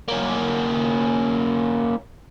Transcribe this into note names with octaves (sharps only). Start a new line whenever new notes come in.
A#3 C#4